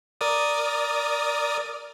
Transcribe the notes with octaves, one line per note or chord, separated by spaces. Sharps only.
A#4 D5 D#6